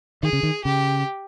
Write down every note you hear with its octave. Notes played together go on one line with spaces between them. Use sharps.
D#3 G#4
C#3
D#3
C#3 G4